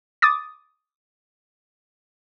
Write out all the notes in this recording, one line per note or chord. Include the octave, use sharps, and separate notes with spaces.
D6 D#6 A6